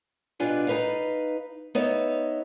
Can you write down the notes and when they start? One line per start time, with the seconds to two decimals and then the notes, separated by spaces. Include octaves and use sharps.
0.40 B2 G3 D4 F4 B4 G#5
0.67 D#4 B4 F5
1.75 B3 D#4 C#5 E5